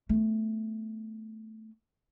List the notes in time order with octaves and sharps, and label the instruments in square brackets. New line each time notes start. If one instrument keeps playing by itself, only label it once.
[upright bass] A3 B3